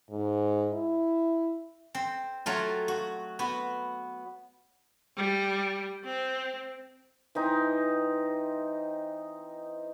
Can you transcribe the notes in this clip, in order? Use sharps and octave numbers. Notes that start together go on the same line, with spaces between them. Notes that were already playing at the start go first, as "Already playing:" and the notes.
G#2
E4
C4
F#3 A3 F4
F#4
B3 F#4
G3
C4
E3 C4 D#4